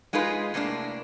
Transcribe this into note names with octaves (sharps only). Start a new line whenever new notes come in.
G#3 D#4 F4 G#4 B4
A2 C3 A#3 D4